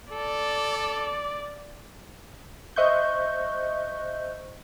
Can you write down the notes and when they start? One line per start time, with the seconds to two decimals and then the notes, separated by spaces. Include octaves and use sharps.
0.12 A4 D5
2.76 C5 D#5 E5 C#6 F#6 G6